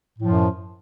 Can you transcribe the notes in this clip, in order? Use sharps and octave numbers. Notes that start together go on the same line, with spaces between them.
F#2 A2 F3